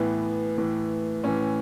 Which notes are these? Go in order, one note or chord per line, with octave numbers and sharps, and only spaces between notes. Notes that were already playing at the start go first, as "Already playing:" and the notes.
Already playing: A2 E3 B3
A2 E3
A2 E3 C#4